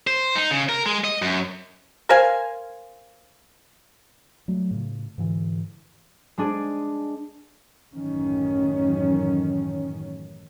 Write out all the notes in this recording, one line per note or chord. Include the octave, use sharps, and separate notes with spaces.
C5
D#4
C#3
A#4
G#3
D#5
F#2
A#4 C5 F5 G#5
F#3 A3
A2 C#3
G#2 D3 E3
G#3 D4 G#4
A1 F#2 D#3 C#4